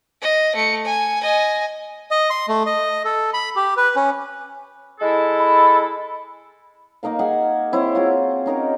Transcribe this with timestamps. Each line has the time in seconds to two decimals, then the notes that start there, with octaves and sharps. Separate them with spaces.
0.22 D#5
0.56 A3 C#7
0.85 G#5
1.22 D#5 G#5
2.11 D#5
2.30 C6
2.48 A3
2.66 D#5
3.05 A4
3.34 B5
3.56 G4
3.77 B4
3.96 C#4
5.00 G#3 E4 A4
5.39 B5
7.03 A#3 D#4 A#4 F5
7.19 G#4 F#5 G#5
7.72 C4 E4 C5 C#5
7.95 F4 F#4 G#4
8.46 C#4 D#4 A#4 G5